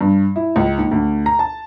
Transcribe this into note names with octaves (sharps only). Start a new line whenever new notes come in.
G2
E4
C#2
D#2
D2
A#5
A5